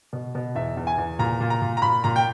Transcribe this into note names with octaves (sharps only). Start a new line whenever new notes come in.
B2
B2
E2 E5
E2
G#5
E2
A#2 A#5
A#2
A#5
A#2
A#5
A#2 B5
A#2 A#5
G5